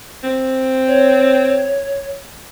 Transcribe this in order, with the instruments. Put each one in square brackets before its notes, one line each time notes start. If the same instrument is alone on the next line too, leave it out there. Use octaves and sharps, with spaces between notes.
[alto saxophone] C4
[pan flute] C#5